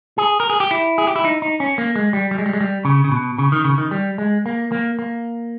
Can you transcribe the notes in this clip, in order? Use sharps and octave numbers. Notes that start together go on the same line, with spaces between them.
G#4
A#4
G#4
G4
E4
G#4
G4
E4
D#4
D#4
C#4
A#3
G#3
G3
G3
G#3
G3
G#3
G3
C#3
C#3
B2
C#3
D#3
C#3
D#3
G3
G#3
A#3
A#3
A#3